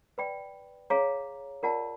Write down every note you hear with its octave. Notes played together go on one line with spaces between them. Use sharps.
B4 D5 G5 B5
G#4 C#5 F5 A#5
F4 A#4 D5 F#5 A5